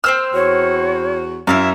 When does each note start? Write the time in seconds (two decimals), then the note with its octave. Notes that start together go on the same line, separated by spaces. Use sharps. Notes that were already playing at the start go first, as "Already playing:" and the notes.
0.04 C4 C5 E6 F6
0.34 E2 F#4 C#5
1.47 F#2 E4 E5 F5